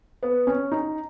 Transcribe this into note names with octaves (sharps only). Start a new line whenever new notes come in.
B3
C#4
D#4